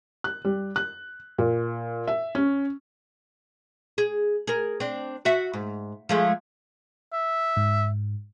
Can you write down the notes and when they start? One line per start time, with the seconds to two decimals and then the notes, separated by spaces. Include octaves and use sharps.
0.24 F#6
0.45 G3
0.76 F#6
1.38 A#2
2.07 E5
2.35 C#4
3.98 G#4
4.47 G#4 A#4
4.80 C4 D4
5.25 F#4 E5
5.53 G#2
6.09 F3 G#3 A3
7.13 E5
7.57 G#2